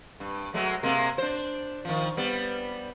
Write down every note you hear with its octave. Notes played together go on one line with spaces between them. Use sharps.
G2
F#3 G#3 A3
C3 G#3 A#3
D4 C5
D#3 F3
G3 B3